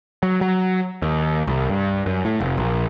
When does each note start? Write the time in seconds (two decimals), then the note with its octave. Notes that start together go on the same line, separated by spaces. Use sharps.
0.23 F#3
0.41 F#3
1.02 D#2
1.47 C2
1.69 G2
2.06 F#2
2.25 A2
2.40 F1
2.57 A#1